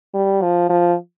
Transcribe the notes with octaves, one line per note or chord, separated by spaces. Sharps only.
G3
F3
F3